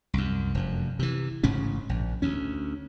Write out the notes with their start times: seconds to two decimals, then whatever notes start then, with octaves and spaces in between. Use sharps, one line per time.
0.14 C2 F#2
0.54 F1 F#2
0.99 C3 E3
1.43 A1 G#2 C#3 C#4
1.89 A#1
2.22 D2 C#4